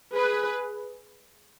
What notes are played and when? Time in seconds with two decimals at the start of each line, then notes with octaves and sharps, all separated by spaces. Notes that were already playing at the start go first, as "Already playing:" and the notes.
0.15 G#4 B4